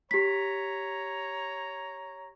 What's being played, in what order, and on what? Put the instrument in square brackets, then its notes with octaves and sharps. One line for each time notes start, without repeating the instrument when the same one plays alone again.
[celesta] G4 B6 [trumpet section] C#5 A#5